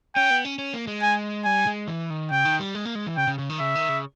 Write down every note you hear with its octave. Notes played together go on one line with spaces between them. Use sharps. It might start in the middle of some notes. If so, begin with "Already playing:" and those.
C#4 G5
B3
C#4
C#4
A#3
G#3
G#5
G3 G#5
G#3
E3
D#3
C#3 G5
D#3
G3
G#3
A#3
G#3
E3
C#3 G5
C#3
C#3
D#3
C#3 E5
D#3
C#3